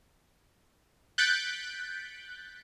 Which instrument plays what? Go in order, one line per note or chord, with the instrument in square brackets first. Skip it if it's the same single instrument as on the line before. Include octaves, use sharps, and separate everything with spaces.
[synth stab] F#6 G6 A6 B6 C#7 D7